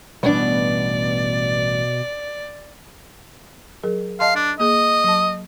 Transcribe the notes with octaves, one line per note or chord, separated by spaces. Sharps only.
A1 B2 G3 B3 D4 D5
F#3 G#4 A#4
D#5 F5 A5 C6
D4
A#3 G#4 D#5
F#3 A5